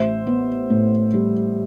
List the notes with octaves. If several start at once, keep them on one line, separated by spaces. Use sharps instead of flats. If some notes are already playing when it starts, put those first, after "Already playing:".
Already playing: A1 C5 E5
B3
A2
G3